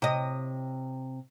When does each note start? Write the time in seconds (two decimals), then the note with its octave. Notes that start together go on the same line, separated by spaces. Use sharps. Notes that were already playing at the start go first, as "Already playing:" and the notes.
0.02 C3 D#5